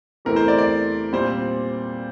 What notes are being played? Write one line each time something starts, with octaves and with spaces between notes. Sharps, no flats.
E2 C3 E3 A3 C4 A#4
C5
D5
D5
A#2 G3 C4 C5